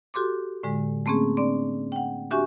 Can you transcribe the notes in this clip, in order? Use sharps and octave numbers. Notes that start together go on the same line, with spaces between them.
F#4 G4 A4 C6 D6
A2 D3 G#3
A3 A#3 C4 C#4 G#4
C4 D4 D5
F#5 G5
D4 F#4 G4 E5 G#5 C#6